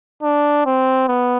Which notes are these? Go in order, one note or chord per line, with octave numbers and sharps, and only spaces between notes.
D4
C4
B3